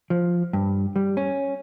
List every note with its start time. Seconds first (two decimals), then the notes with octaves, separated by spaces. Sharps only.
0.10 F3
0.53 G2
0.96 G3
1.17 C#4